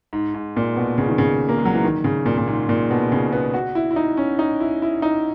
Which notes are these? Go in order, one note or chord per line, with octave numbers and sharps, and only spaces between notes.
G#2
G#2
A#2
B2
C#3
D#3
C#3
A#3
G#3
F#3
E3
D#3
C#3
A#2
A#2
G#2
A#2
B2
C#3
B3
F#4
E4
E4
D#4
C#4
D#4
E4
E4
D#4